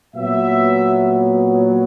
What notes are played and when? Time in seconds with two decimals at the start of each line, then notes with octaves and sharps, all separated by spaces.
0.14 A#2 F#3 B3 E5